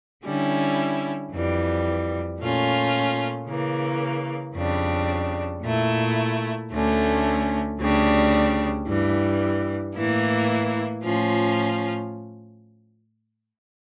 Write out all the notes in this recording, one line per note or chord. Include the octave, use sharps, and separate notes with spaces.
D3 G3 C#4 E4
F2 E3 G3
A#2 A3 C#4 F4
C#3 E3 A#3
F2 C#3 G3 D4
A#2 A3 E4
D2 D3 A3 C#4
D2 C#3 G3 D4
G2 E3 G3
A2 E3 A#3 E4
A2 F3 C#4 F4